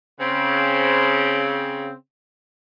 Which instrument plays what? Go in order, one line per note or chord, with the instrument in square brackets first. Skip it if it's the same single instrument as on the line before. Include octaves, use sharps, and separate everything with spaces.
[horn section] C#3 C4